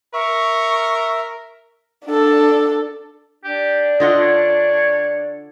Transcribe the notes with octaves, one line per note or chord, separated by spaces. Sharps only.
A#4 E5 C#6
D4 A4
D4 G4
D3 F4 D#5 F#5
C#5